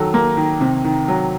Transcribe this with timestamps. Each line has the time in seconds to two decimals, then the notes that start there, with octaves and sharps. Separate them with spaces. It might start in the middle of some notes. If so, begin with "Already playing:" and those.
Already playing: D#3 F#3 A4
0.14 A#3
0.37 D#3
0.61 C3
0.84 D#3
1.08 F#3